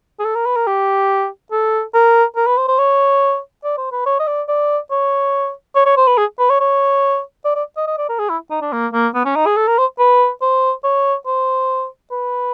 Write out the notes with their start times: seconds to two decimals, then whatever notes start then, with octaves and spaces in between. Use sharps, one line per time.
0.20 G#4
0.25 A4
0.35 A#4
0.46 B4
0.56 A#4
0.67 G4
1.52 A4
1.94 A#4
2.36 A#4
2.47 B4
2.57 C5
2.68 C5
2.79 C#5
3.64 D5
3.78 C5
3.92 B4
4.06 C#5
4.20 D#5
4.27 D5
4.48 D5
4.91 C#5
5.76 C#5
5.86 C#5
5.97 C5
6.07 B4
6.18 G#4
6.39 B4
6.50 C#5
6.60 C#5
7.45 D5
7.56 D5
7.77 D#5
7.87 D#5
7.98 D5
8.09 A#4
8.19 G#4
8.30 E4
8.50 D#4
8.62 D4
8.72 A#3
8.93 A#3
9.15 B3
9.25 C#4
9.36 D#4
9.46 G#4
9.57 A4
9.68 A#4
9.78 C5
9.99 B4
10.42 C5
10.84 C#5
11.26 C5
12.11 B4